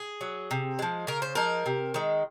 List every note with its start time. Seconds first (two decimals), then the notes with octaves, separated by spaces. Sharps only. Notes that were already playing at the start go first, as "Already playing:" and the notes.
Already playing: G#4
0.21 F#3
0.51 C3
0.79 F3 G#3
1.07 C#3 A#4
1.22 C5
1.35 F3 G#3 A#4
1.66 C3
1.94 D#3 G#3